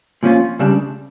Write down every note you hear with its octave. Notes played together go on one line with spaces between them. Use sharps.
A#2 F3 C#4 F4
C#2 C#3 G3 D4